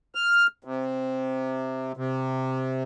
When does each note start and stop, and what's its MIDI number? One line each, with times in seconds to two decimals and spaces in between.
0.15 0.47 89
0.64 1.92 48
1.97 2.83 48